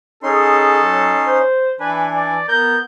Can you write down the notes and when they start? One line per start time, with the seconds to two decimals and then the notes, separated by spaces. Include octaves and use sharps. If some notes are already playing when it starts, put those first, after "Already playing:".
0.23 C#4 D#4 G#4 A4 C6
0.82 F#3
1.26 C5
1.80 E3 D4 B4 G#5
2.14 D5
2.48 B3 A#4 G6